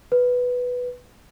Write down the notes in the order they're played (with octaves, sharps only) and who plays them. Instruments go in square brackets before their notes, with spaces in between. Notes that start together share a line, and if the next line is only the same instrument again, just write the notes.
[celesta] B4